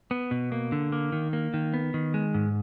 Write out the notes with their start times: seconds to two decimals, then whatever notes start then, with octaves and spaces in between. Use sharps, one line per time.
0.11 B3
0.31 B2
0.52 A#3
0.72 D3
0.92 A#3
1.12 D#3
1.33 A#3
1.54 D#3
1.74 B3
1.94 D#3
2.14 G#3
2.34 G#2